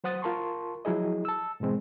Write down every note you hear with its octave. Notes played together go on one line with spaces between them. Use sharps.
F#3 C5 F#5 D#6 A6
F4 A#4 A5 C6 C#6
F3 F#3 E4 G#4 D#5
A5 E6
G#2 B2 E3 G#3 C4